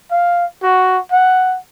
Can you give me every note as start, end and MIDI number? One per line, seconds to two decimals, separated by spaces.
0.11 0.45 77
0.63 0.98 66
1.12 1.56 78